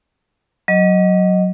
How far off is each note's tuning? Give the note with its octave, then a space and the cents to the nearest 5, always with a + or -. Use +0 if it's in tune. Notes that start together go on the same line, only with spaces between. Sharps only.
F#3 +0 D#5 +0